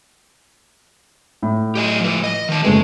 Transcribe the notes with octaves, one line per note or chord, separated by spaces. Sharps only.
A2
G4 D#5 G#5
F3 B4
D#5
D#3 A5
F#1 G#3 A3 G#4 B4